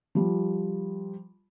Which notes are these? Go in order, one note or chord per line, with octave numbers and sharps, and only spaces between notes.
F3 G3